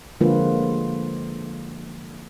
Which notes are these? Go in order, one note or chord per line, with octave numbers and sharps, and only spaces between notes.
D3 F3 G#3 A#3 F4 B4